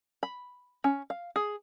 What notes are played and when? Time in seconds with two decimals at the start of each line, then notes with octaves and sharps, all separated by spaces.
0.23 B5
0.84 C#4
1.10 F5
1.36 G#4